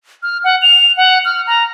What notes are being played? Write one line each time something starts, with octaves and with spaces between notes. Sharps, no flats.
F6
F#5
F7
F#5
F6
A#5